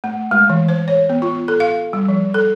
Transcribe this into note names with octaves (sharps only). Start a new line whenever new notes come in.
A3
G#3
E3
C5
C#5
B3
F4
A4
F5
G3
F3
A4